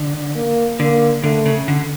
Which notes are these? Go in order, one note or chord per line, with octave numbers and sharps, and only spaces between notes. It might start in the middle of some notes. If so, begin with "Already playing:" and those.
Already playing: D3
A#3
D3 A#3
D3 A3
C#3
D3